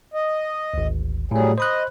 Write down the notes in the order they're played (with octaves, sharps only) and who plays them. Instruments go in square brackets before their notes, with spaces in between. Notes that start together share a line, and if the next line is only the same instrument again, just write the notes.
[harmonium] D#5
[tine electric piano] G#1 D2
[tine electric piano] A2 A3 [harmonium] F#3 G3 G#4
[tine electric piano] C5 B5 F#6 [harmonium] D#5